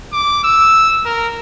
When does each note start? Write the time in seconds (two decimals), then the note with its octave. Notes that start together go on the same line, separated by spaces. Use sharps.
0.13 D6
0.44 E6
1.06 A#4